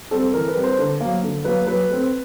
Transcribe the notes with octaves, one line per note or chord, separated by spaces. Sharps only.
G3 C4 A4
E3 A#4
B4
G3 C4
C5
D3
F#3 A#3
D3
F#3 A#3 B4
F#3 B4
A3 C4